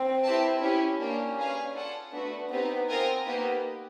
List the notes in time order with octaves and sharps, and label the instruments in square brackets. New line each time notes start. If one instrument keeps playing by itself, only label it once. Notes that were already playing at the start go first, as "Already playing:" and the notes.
Already playing: [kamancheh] C4
[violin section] E4 G4 B4 E5 A5
C#4 E4 G4
[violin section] A#3 D4 G4 [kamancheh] C#4
[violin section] G#4 B4 D5 F5 G#5
F4 A4 D5 F#5 A5
[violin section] A3 D4 F#4 B4 [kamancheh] B3
[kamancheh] B3 [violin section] C4 D#4 G4
[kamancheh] C4 [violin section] F4 A#4 D#5 G#5
[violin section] A#3 D#4 G4 [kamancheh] B3